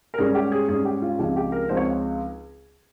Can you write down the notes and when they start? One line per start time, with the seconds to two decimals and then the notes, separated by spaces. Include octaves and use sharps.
0.14 A#4
0.18 G#2 G3 C#4 G#4
0.35 G4
0.52 G#4
0.69 G#2 G3 C#4 G#4
0.85 G4
1.02 F4
1.18 C#2 C#3 F3 C4 D#4 G4
1.36 G4
1.52 A#4
1.69 C#2 C#3 F3 C4 D#4 C5
1.77 C#5